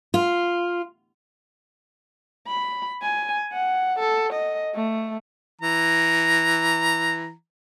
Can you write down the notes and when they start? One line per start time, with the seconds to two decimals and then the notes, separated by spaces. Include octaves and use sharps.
0.14 F4
2.47 B5
3.02 G#5
3.53 F#5
3.99 A4
4.33 D#5
4.75 A3
5.61 E3 A#5